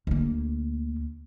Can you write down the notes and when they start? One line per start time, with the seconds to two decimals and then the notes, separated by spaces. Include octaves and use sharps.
0.07 D2 A#3